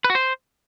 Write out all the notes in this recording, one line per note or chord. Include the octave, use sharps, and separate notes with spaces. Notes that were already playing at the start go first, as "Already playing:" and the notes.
B4
F#4
C5